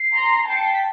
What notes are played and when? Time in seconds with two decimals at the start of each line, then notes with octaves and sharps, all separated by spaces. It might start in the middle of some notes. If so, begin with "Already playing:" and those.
Already playing: C7
0.15 A#5 C6
0.48 G5 A5 C7
0.56 C#7
0.64 C7
0.73 B6